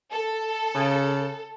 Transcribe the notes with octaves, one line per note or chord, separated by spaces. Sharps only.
A4
C#3